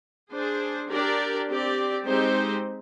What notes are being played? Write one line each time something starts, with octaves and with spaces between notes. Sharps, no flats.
D4 G#4 C5
D4 G4 A#4 D5
C4 G4 D5
G#3 C4 D#4 G4 C5